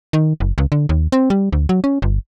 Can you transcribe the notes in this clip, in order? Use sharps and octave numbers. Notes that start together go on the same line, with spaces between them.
D#3
F#1
C#2
D3
D#2
C4
G3
D2
F#3
C#4
G1